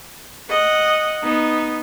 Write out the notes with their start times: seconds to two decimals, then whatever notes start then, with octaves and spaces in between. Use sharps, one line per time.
0.50 D#5 F#5
1.23 B3 D#4